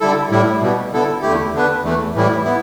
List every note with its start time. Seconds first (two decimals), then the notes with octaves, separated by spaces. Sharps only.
0.01 D3 G3 E4 A4
0.31 A2 G3 E4
0.61 B2 G3 B3
0.92 D3 B3 E4 A4
1.22 E2 D3 A3 E4 G4
1.54 D3 B3 D4 B4
1.83 E2 E3 A3
2.15 A2 E3 G3 E4
2.45 B3 E4